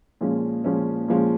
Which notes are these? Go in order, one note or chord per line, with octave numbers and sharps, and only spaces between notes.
A#2 F3 G#3 C#4
A#2 F3 G#3 C#4
A#2 F3 G#3 C#4